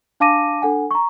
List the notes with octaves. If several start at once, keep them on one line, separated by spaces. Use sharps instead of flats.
D4 F5 A5 D6 A#6 D#7
D4 A4 F#5 G#5
A#5 C#6